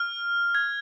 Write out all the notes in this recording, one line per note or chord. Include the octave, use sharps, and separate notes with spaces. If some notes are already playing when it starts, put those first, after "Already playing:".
Already playing: F6
G#6